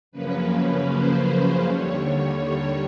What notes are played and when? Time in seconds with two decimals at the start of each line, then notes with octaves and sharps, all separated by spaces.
0.12 F#2 C#3 F3 A#3 C#4 B4
0.88 C5
1.65 D#2 D3 G3 C#5
2.42 C#5